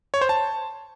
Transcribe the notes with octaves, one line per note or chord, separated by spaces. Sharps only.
C#5
C5
A5